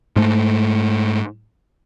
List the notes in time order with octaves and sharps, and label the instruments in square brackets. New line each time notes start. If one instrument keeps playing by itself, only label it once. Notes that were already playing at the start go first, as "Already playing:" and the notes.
[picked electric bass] G#2 A3